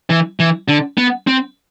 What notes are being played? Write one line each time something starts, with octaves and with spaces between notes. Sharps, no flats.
E3
E3
D3
B3
C4